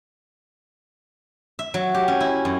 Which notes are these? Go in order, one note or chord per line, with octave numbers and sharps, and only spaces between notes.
E5
F#3
G4
C#4
E4
F#2